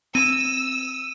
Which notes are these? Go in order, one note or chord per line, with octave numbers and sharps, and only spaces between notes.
C4 E6 D#7